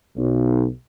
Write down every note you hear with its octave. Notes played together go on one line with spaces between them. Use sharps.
B1